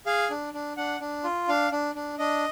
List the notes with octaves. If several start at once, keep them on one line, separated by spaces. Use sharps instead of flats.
G#4 F5
D4
D4
D4 F#5
D4
F4
D4 F5
D4
D4
D4 D#5